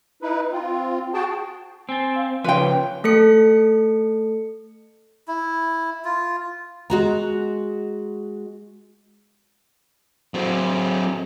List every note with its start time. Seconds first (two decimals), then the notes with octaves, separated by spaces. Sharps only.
0.22 D#4 E4 B4
0.52 C4 F4
1.14 F#4 G#4 G5 A5
1.89 C4 G#5 A6
2.16 F5
2.44 C#3 F3 B4 C#5 F5 G5 C6
3.04 A3 A4 C#7
5.28 E4
6.05 F4
6.90 G#3 F#4 A#5
10.34 F#3 C4